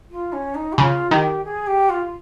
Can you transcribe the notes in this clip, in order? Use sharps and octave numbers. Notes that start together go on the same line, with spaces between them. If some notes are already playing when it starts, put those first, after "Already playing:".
F4
C#4
D#4
G4
C#3 F4
D#3 G4
G#4
G4
F4